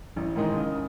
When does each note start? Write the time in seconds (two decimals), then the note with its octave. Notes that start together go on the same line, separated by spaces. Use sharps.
0.16 A1
0.36 G#2 D#3 G#3 D#4
0.56 C#3